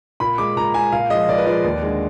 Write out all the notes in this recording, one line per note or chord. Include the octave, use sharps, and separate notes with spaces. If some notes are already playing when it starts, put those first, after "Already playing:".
A#2 B5
G#3 D6
A#2 A#5
G#3 G#5
A#2 F5
F3 G#3 D#5
A#2 D5
B4
F3 G#3 D5
D#2
D3 G#3